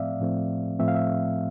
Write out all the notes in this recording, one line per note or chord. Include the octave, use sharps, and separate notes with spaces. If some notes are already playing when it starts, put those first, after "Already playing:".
Already playing: A2 F3 A3 C4 D5 E5 F5
A2 F3 A3 C4
A2 F3 A3 C4 E5
F5
E5